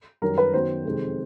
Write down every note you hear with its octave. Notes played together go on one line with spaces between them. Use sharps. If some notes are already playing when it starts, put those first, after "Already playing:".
F#2 D#3 G3 A#4
B4
F#2 D#3 F#3 B3 C5
F2 C3 D#3 G#3